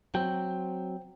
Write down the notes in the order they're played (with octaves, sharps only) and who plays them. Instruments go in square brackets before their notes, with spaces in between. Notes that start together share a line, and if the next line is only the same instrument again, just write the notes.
[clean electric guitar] F#3 C4 [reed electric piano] G5